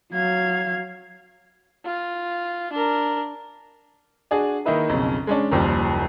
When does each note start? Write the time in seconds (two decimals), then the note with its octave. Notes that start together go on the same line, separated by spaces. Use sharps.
0.13 F#3 F5 G#6
1.85 F4
2.72 D4 A#4
4.31 D4 F#4 G#4
4.66 D#3 A#3 D#4 E4 B4
4.89 B1 F2 C#3
5.27 G#3 C#4 D4
5.52 F#1 D#2 F3 G3